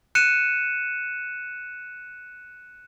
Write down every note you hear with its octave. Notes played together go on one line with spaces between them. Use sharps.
F#6 C#7 D#7 E7